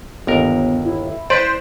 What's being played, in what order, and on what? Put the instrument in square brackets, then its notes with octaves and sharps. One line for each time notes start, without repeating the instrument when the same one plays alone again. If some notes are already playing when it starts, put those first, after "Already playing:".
[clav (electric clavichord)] G1 D#2 A#4 [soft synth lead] B3
[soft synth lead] E4
[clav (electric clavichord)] B4 D5 [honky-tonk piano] C5